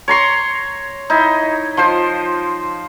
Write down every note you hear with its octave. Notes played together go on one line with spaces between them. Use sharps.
C#5 A#5 C6 C#6
D#4 E4
F3 F4 C5